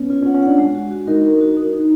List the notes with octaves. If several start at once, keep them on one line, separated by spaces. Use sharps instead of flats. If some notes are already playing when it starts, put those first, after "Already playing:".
Already playing: B3 C#4
C#4 F4
C#4
F#5
C#4
D4 F#5
G#3
F#4
F#4
D#4 A#4
A#4
F#4
D#4
D#4